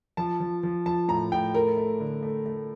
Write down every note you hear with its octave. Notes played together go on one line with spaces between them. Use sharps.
F3 A5
F3
F3
F3 A5
A2 A#5
A2 G5
A3 A#4
A3
D3
A3
A3